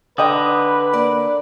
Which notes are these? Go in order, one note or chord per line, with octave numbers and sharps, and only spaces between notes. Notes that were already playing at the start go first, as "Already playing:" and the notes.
D3 B4 D#5 G5 D#6
A#3 D5